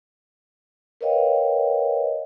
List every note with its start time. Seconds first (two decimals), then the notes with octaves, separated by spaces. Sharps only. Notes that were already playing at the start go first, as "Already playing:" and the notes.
1.01 A#4 B4 C#5 D#5 F5 G5